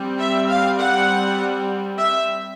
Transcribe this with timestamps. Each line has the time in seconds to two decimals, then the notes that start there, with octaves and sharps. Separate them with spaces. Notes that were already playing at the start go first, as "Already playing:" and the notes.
Already playing: G3 C4
0.19 E5
0.49 F5
0.79 F#5
1.98 E5